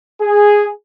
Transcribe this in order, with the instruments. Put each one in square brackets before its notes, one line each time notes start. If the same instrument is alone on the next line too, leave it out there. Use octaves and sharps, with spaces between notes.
[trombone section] G#4